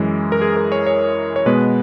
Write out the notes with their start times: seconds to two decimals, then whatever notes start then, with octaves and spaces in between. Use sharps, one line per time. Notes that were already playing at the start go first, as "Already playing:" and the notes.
Already playing: F#2 E3 G#3
0.32 A#4
0.41 G#4
0.57 A#4
0.72 C#5
0.87 C#5
1.36 C#5
1.46 B2 G#3 B3 B4